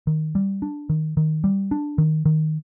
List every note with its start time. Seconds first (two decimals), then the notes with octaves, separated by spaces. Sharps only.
0.07 D#3
0.35 G3
0.62 D4
0.89 D#3
1.17 D#3
1.44 G3
1.71 D4
1.98 D#3
2.26 D#3